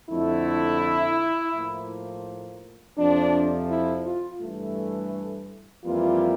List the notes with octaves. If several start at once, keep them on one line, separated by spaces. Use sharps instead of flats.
F2 D3 A3 E4
A2 F3 A#3
F2 C3 F3 D4
E4
F4
G2 E3 A3
F2 E3 G3 A#3 F4